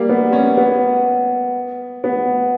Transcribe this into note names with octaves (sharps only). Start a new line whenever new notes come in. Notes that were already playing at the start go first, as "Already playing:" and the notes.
Already playing: G3 A#3
B3
C#4
B3
B3